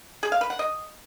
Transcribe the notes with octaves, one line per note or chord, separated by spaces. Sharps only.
G#4
F5
B4
F#5
D#5